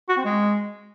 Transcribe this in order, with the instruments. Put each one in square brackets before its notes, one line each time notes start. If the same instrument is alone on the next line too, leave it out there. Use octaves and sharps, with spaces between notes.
[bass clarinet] F#4
C4
G#3